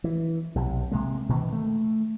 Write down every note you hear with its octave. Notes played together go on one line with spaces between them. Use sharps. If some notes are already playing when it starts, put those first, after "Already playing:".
E3
B1 C3
C3 G#3 A#3
B2 D#3 E3 A#3
A3